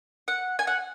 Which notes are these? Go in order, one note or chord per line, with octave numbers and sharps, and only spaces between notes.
F#5
G#5
F#5